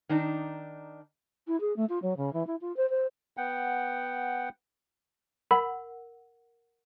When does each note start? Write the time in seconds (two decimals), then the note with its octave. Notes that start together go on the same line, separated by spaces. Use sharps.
0.09 D#3 D4 D#4
1.48 E4
1.61 G#4
1.76 A3
1.89 F4
2.03 F#3
2.17 C#3
2.33 E3
2.47 E4
2.61 F4
2.77 C5
2.90 C5
3.37 B3 F#5 G5
5.51 A#4 F#5 B5